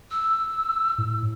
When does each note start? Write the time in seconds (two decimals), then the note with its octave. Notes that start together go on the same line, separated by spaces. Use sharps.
0.11 E6
0.98 A2